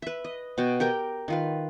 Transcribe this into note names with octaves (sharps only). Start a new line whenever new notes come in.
B4 E5
D#5
B2 F#4 G5
G4 A#4 G5
D#3 F4 B4